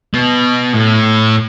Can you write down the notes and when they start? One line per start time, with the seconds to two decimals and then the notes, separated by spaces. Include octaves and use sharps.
0.14 B2
0.74 A2